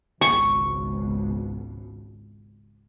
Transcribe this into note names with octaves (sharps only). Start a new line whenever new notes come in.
G#1 C#2 B2 C#6